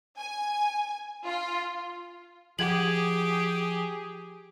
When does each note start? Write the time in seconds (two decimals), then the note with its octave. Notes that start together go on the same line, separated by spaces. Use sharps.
0.19 G#5
1.26 F4
2.59 F3 G4 G#4 F#5 G#6 F#7